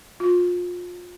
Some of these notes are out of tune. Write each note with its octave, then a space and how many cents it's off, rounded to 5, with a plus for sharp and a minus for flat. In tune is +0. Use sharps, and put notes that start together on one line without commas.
F4 +30